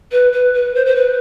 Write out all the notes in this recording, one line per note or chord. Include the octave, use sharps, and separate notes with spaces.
B4
B4
B4
C5
C5
B4